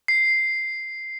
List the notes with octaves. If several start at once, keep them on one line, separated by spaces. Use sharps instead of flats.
C7